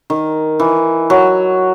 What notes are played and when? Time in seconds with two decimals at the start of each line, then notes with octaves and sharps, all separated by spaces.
0.10 D#3
0.60 E3
1.10 F#3